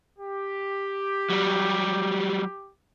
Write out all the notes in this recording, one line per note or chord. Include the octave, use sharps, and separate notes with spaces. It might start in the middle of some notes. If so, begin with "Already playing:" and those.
G4
F#3 G3